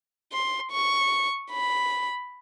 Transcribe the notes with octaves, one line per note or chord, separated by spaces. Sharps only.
C6
C#6
B5